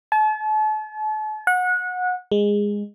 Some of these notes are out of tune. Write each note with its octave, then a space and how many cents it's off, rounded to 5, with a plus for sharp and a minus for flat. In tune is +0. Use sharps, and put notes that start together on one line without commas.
A5 -40
F#5 -25
G#3 -15